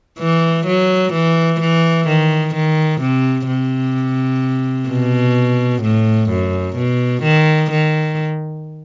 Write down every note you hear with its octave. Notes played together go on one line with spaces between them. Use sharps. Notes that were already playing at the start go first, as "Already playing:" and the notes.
E3
F#3
E3
E3
D#3
D#3
C3
C3
B2
A2
F#2
B2
D#3
D#3